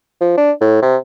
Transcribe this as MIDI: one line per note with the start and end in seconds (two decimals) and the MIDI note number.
0.21 0.37 53
0.37 0.52 62
0.61 0.79 45
0.82 0.97 48